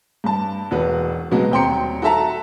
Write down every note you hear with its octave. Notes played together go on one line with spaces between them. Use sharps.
G2 A5
E1 F#4 B4
B2 F#3 G#3 F#4
D#1 C4 G5 A#5 C6 C#7
F#4 A4 E5 A5 A#5